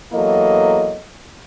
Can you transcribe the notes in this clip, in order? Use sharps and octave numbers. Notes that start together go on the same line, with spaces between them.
E2 F#3 A#3 E4 A4 D#5